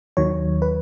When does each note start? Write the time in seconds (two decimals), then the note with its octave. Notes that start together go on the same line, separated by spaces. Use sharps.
0.17 D#2 D#3 F#3 C#5
0.62 B4